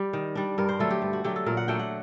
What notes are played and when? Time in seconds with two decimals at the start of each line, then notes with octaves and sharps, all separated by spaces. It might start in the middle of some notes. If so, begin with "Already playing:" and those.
Already playing: G3 G4
0.13 D#3
0.35 G3 D4
0.58 G2 A#4
0.69 C5
0.79 D3 F#3 A3 A4
0.90 G4
1.02 G2
1.13 F#4
1.24 D3 F#3 A3 G4
1.36 A4
1.46 A#2 A#4
1.57 F#5
1.68 F#3 A3 D4 G5
1.79 F#5